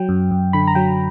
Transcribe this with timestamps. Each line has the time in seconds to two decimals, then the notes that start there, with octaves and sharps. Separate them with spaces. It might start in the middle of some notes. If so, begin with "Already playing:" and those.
Already playing: F#3 G5
0.09 F#2
0.31 F#2
0.53 D3 B5
0.67 A#5
0.75 F#3 G5